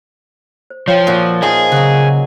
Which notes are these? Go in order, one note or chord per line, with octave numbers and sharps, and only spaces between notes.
C5
F3 C#5 F5 G5
A#2 F#4
F3 D#4 G#4 E5
C#3 F#3 F#4